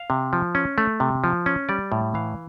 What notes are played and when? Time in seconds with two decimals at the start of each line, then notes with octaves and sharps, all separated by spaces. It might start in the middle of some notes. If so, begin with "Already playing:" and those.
Already playing: F5
0.10 C3
0.33 F3
0.55 C#4
0.78 A3
1.00 C3
1.24 F3
1.46 C#4
1.69 G3 D5
1.92 A2
2.14 E3 F5